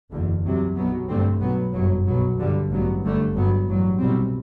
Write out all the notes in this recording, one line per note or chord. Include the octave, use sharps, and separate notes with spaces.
F#1 E2 D3
C2 C3 F#3
B1 B2 F#3 B3
G2 D3 A3 C4
B1 B2 F#3 B3
G1 F#2 F#3
B1 B2 F#3 B3
G2 D3 G3
A1 G2 F#3 B3
G1 G2 D3 A3
G1 G2 F#3 B3
A1 G2 F#3
C2 B2 G3 C4